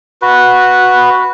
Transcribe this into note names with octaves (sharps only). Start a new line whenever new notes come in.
F#4 B4